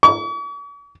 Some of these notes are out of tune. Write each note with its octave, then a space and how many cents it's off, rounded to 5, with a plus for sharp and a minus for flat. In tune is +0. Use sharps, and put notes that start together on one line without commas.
C#6 +45